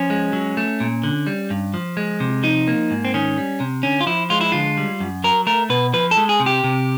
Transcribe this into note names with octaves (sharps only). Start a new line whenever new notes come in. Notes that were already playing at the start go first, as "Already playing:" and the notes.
Already playing: F3 C#4
G#3
F#3
A3
A#2
D3
G3
G2
F3
G#3
C3
F3 D#4
A#3
G#2
C4
D#3 C#4
G3
C3
D3 C#4
F4
F3 E4
G#3 F4
E4
D3 F4
G3
F#2
F#3 A#4
A3 A#4
B2 B4
F3 B4
A4
G#3
G#4
C3
G4
C3